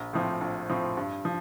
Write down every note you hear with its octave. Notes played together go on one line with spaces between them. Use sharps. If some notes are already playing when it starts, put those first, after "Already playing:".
Already playing: A#1
A2 F3 C4
A#1
A2 F3 C4
G2
F3